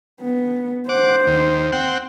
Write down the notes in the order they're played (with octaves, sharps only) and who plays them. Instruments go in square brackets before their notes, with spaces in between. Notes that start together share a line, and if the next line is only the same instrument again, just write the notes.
[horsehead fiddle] B3
[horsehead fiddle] C5 [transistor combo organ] F#5 D6
[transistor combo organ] D#2
C4 F#5 G5